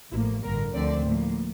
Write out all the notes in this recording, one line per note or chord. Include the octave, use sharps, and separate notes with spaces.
A1 A2 F3 A#3 E4
A1 G2 D3 A#4
D2 D3 F3 A3 C4 D5
A2 F3 A#3